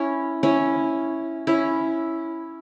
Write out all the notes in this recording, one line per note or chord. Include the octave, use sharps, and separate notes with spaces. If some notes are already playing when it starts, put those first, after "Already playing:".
Already playing: C#4 E4
C#4 E4
C#4 E4